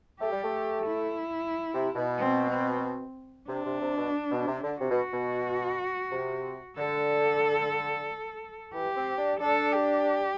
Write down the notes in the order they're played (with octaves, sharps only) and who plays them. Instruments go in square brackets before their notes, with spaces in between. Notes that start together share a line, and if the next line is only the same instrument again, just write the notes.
[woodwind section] A3 [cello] G4
[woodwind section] G3
A3
[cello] E4
[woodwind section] C3
B2
[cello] C4
C4
[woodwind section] C3 [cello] D4
[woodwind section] C3
C3
B2
B2
C3
D3
[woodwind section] C3 [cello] F#4
[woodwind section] B2
B2
C3
[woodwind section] D3 [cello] A4
[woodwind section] E3 [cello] G4
[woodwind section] C4
D4
[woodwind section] D4 [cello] A4
[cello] G4